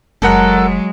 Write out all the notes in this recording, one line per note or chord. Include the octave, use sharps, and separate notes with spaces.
F#1 F#3 G#3 A4 A#4 F#5